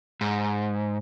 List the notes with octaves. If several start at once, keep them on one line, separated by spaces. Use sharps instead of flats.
G#2